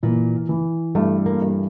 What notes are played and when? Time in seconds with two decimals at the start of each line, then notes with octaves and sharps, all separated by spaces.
0.03 A#2 E3
0.49 E3
0.95 G2 A3
1.26 A#3
1.42 G2